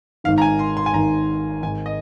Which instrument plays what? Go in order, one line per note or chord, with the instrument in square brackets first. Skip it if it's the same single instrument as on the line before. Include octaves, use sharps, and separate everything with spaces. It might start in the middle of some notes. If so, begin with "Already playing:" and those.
[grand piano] G#1 G#2 D#3 [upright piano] F5
[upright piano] A#5
G#5
C6
C6
G#5
[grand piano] G#1 G#2 D#3 [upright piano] A#5
[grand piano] G#1 G#2 D#3 [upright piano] G#5
[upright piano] D#5